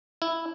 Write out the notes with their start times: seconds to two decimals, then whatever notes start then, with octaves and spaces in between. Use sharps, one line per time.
0.22 E4